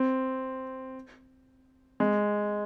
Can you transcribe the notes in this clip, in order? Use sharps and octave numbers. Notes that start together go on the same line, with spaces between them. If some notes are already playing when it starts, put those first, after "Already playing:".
Already playing: C4
G#3